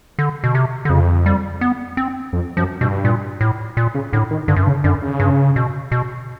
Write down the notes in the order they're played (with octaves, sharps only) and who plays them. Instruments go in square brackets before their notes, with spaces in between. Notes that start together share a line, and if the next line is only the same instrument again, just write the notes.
[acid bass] D3
B2
C3
D3
[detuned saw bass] F2 [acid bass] C#3
[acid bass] G3
B3
C4
[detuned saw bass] F2
[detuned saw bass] F#2 [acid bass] F3
[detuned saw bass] G2 [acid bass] B2
[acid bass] A#2
A2
A#2
[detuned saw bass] C#3
[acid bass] A2 [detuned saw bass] D3
[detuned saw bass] D#3
[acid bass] G2 [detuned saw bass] D3
[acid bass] F#2
G2
[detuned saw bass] C#3
[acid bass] F#2 [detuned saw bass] D3
[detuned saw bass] C#3
[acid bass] G2
B2
B2